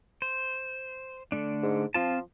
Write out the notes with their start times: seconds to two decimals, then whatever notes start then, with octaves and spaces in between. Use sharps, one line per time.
0.22 C5
1.32 D3 A3 D4
1.63 G#2
1.94 F3 C4 F4 A5